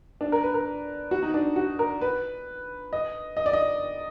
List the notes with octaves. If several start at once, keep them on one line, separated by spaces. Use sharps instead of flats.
D4
A#4
B4
A#4
F#4
D#4
D4
F#4
A#4
B4
D#5
D#5
D5
D#5